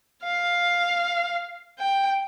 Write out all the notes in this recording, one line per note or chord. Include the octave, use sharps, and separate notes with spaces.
F5
G5